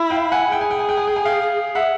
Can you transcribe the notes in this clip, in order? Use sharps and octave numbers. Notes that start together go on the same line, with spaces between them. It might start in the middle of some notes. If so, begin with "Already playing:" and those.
Already playing: E4
F5 G5
F#5 G#5
G#4 G5
G#5
G5
G#5
G5
G#5
G5
G#5
F5 G5
E5 F#5